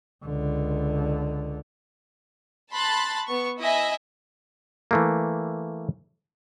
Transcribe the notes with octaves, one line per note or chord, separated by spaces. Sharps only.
C#2 D3
A5 B5 C6 F#6 A6
B3 C#6
E4 D#5 E5 G#5
E3 A3 A#3